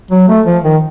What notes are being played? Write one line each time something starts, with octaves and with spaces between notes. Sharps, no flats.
F#3
A3
F3
D#3